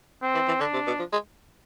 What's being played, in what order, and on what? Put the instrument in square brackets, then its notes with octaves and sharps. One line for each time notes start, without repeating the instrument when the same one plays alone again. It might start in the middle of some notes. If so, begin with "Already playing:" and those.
[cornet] C4
[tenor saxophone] E3
E3
[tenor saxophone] D3 [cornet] D4
[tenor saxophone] C3
B2
F3
G#3